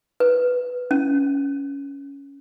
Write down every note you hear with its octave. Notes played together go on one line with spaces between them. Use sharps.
B4
C#4